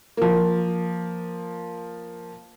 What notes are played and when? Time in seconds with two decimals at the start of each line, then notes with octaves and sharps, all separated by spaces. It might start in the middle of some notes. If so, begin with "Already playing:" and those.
0.17 F3 A#3